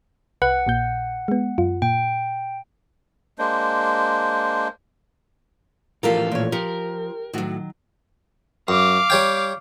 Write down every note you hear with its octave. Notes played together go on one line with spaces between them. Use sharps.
C2 B4 F#5 F#6
A#1 A#2 G6
G#3 B3
F#2 F4
A#2 G5
G#3 A#3 D4 C5
A2 E3 F3 F4 G4 A4 A#4 F5
A#2 C#5
F3 G4 A#4
A2 D#3 F#3 F#4
F#2 F5 D6
G3 C#5 G5